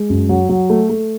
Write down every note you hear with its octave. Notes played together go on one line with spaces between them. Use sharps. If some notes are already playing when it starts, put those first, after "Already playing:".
Already playing: G#3
F#2
F#3
F#3
A3
A3